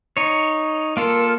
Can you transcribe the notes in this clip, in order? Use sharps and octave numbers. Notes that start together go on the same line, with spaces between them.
D#4 C#5
A#3 F4 A4 A#4